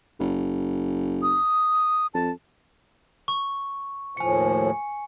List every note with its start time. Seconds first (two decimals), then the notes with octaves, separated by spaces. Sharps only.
0.20 F#1
1.22 D#6
2.14 F2 A5
3.28 C#6
4.17 D#2 A2 F3 G#5 C#7